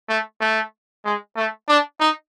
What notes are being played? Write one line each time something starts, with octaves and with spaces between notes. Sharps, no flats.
A3
A3
G#3
A3
D4
D#4